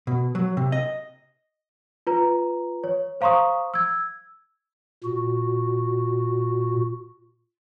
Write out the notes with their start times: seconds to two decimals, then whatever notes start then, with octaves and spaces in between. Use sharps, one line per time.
0.07 B2
0.35 F#3
0.57 C3
0.72 D#5
2.07 F4 B4 A#5
2.84 C#5
3.21 C5 F5 A#5 C6 C#6 D#6
3.74 E6 G#6
5.04 A#2 F#4